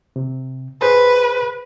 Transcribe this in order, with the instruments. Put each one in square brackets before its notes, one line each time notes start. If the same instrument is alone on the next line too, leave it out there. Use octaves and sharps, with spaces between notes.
[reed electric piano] C3
[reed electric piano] G#4 C5 C6 [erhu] B4